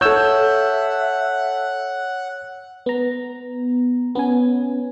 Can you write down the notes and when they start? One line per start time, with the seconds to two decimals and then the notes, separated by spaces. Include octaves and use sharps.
0.01 A4 C#5 E5 F#5 E6 G6
2.86 B3 A#5
4.15 B3 C#4 G#5